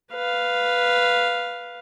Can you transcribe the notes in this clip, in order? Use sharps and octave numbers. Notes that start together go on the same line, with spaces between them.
B4 F5